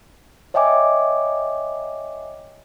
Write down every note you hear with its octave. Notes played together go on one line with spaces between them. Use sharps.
C#5 D#5 E5 G5 G#5 D6